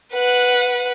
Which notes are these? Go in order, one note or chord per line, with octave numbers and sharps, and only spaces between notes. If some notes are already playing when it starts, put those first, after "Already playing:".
B4 F#5